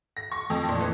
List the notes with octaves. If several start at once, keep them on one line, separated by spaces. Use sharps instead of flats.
A#6
C#6
F2
A#2
E3